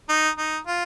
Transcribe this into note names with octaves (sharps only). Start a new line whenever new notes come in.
D#4
D#4
F4